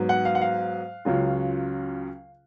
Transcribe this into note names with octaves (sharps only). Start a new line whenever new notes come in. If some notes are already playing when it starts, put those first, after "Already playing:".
Already playing: G#2 F#3 B3
F#5
F5
F#5
F5
C#2 C#3 F#3 C#4 F4